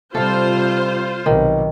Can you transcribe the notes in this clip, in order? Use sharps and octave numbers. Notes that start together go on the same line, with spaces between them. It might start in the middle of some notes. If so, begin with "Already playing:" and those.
C3 G3 F4 A4 C5 F5
B1 C3 D#3